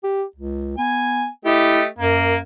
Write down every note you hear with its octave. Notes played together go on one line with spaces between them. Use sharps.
G4
C#2
B3 G#5
A3 E4 G4 D#5
F#2 A#3